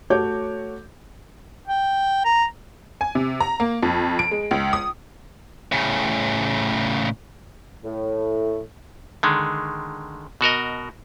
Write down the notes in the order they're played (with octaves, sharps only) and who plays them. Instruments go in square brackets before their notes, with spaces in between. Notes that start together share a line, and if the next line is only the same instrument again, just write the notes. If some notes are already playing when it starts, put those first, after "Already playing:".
[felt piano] A3 F#4 C#5 D6 G6
[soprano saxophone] G5
A#5
[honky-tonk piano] G#5
C3
A#5
A#3
F2
D7
G#3
C#2
D#6
[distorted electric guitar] A2 C#3
[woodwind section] A2
[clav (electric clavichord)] D3 D#3 G#3
B2 F#4 A#4 D#5